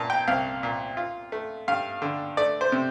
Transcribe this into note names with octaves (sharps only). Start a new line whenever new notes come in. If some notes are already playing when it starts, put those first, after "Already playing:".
Already playing: A#2 A5 A#5
G5
C2 F5
A#2
F4
A3
G2 F5
D3
A3 D5
C5
C3